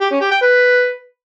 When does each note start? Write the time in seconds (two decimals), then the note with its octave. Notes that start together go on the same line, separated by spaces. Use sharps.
0.01 G4
0.11 C#4
0.21 G4
0.31 G5
0.41 B4